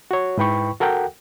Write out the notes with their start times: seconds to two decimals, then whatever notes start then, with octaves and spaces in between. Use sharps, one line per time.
0.11 F#4 C#5
0.37 G#2 E4 B4 G5 B5 C#6
0.80 F#4 A4 A#4 F#5 G5